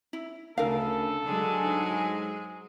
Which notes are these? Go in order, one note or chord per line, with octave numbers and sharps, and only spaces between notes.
E4
D2 C#3 A4 A#4 F5
D3 F#3 G#3 G#4
G#2